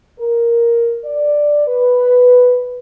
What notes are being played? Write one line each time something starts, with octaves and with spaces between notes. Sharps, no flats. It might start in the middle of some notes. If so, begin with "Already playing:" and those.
A#4
D5
B4